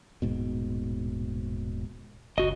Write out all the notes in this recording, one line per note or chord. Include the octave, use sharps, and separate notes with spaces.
D#1 G#2 B2
F#1 C#2 F#4 D#5